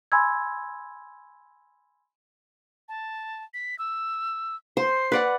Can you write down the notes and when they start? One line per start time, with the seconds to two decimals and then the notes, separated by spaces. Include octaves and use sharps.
0.12 G#5 B5 C6 E6 G#6
2.89 A5
3.54 B6
3.79 E6
4.77 C5 C7
5.12 B4 D5 F#5